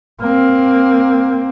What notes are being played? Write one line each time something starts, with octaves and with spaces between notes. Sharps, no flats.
A#3 C4